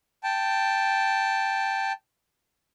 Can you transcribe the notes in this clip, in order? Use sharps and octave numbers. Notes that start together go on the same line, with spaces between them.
G5 A5